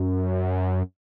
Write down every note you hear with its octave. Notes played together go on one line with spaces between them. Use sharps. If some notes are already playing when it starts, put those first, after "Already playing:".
Already playing: F#2